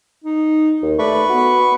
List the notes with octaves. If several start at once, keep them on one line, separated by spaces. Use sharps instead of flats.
D#4
D#2
A3 B4 D5 B5 C#6
B3 F#4